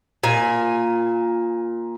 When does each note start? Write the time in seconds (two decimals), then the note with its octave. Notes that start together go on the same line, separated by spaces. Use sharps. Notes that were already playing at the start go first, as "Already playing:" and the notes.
0.24 A#2 G#5